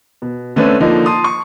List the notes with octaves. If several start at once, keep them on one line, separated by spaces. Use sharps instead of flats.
B2
D3 A3 C4 C#4 B4
D3 F3 A#3 D#4
A5 C6 D#6
C#6